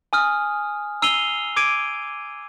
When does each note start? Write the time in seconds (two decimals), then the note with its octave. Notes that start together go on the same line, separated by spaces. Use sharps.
0.13 G#5 D#6 F6
1.02 A#5 E6 C7 D#7 F7 G7
1.56 D6 G#6 D7 D#7